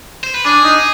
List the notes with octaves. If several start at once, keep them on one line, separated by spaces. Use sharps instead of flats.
C5
B4
D4 G#4
D#4